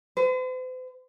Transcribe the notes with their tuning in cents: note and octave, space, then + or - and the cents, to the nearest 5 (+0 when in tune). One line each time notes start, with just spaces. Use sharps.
C5 -45